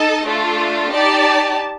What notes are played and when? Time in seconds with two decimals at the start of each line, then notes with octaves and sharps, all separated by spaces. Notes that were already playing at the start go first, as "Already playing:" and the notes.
Already playing: D#4 A4 D#5 A5
0.26 A3 D4 F4 A4
0.93 D#4 G4 D5 A5